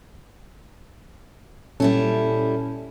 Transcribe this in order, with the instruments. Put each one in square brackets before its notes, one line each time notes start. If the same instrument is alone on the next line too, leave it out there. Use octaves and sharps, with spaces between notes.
[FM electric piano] A#2 C#4 [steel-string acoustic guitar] G3 E4 A4